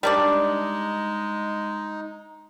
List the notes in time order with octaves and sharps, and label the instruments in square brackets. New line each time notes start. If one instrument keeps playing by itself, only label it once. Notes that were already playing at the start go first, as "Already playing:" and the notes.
[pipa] G3 D4 D5 [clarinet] G#3 [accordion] D#4